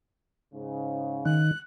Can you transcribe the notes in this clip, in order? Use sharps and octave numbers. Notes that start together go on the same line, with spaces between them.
G#2 C#3
D#3 F#6